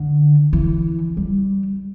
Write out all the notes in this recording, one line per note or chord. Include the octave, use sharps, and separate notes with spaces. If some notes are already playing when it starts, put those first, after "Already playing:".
Already playing: D3
E3
G3